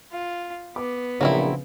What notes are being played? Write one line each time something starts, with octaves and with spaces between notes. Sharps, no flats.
F4
B3 D6
A#1 C#3 F3 F#3 C4 D4 E4